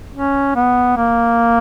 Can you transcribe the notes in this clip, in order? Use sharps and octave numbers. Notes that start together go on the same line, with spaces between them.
C#4
B3
A#3